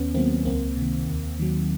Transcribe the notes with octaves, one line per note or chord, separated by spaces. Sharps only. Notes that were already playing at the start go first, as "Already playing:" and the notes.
Already playing: D#2 B3 C#4
D#3 F#3 A#3 C4
C#2 A#3 C4
C3 D#3
D#2
D#3 F#3